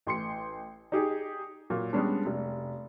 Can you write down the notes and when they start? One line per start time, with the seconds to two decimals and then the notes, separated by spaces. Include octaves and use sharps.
0.07 A1 C6 C#7
0.92 D#4 G4 G#4
1.70 A#2 F#3 A#3
1.93 G3 G#3 B3 C#4 D4
2.26 F1